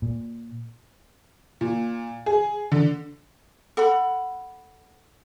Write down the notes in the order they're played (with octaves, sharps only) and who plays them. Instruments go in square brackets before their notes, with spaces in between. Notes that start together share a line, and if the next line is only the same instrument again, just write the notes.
[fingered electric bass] A#2
[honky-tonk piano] A#2
G#4
D3
[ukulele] A4 F#5 B5